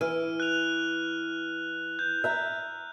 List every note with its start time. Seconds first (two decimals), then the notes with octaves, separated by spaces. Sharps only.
0.01 E3 F6 D#7
0.40 F#6 F7
1.99 G6
2.24 E5 A#5